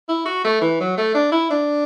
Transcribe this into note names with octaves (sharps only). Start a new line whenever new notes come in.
E4
F#4
A3
E3
F#3
A3
D4
E4
D4